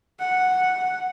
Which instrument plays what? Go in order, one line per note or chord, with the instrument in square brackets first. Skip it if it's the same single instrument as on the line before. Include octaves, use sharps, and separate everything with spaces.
[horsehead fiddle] F#5